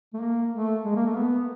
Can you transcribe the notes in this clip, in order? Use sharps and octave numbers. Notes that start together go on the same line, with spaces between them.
A3
A#3
A3
G#3
A#3
A3
B3